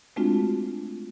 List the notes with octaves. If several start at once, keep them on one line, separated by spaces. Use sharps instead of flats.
G#3 A3 C4 D4 F4 F#4